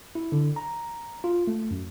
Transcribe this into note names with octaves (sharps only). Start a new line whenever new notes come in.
E4
D3
A#5
F4
A3
F#2